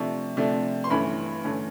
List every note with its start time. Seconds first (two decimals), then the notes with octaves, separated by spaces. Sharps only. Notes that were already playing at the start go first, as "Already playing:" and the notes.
Already playing: C3 F3 A3 D4 C#6
0.37 C3 F3 A3 D4
0.84 C6
0.90 G2 E3 A3 C#4 B5
1.44 G2 E3 A3 C#4